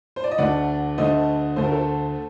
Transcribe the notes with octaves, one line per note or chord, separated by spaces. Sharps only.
C5
D5
D#5
D2 D3 A3 D5 F#5
D2 D3 A3 C5 D#5
D2 D3 A3 C5
A#4
A4 C5